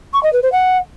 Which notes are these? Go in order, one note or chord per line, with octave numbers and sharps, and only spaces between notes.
C#6
D#5
B4
C5
F#5